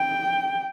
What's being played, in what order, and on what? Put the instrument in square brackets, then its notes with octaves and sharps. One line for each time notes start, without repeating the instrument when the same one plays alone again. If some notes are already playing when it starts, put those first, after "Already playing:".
Already playing: [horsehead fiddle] G5